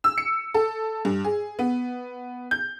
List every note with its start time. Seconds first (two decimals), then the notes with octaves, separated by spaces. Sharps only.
0.04 E6
0.18 C#7
0.54 A4
1.05 G2
1.24 G#4
1.59 B3
2.51 G6